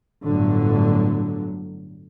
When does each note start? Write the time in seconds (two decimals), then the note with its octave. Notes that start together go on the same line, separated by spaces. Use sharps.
0.24 G1 A2 D3 F#3